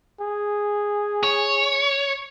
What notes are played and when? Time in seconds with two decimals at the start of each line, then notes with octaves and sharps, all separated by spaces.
0.21 G#4
1.24 C#5